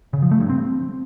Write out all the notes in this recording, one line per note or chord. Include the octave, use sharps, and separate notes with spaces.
C#3
F3
A3
G2
C4